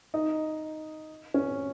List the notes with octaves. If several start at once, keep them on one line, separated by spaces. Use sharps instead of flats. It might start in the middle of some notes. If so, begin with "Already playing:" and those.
D#4
C#4